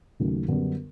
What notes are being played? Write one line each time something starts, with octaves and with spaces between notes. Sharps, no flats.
D#2 C#3 F#3 A3
F#2 D3 G3 B3 D4